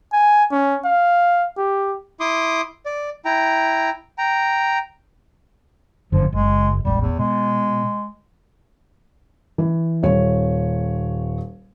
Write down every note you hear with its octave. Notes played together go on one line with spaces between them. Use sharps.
G#5
C#4
F5
G4
E4 C6 D6 D#6
D5
E4 G5 A#5
G5 A#5
G1 F#2 D3 F3
F#1 G#3
E1 A1 G3
E2
B2 G#3
E3
D#1 C#5